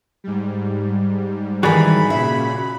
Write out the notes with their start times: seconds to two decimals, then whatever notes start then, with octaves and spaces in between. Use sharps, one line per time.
0.24 G#2 G3
1.63 D#3 E3 F#4 G#4 D5 B5
2.10 A#2 C#3 E5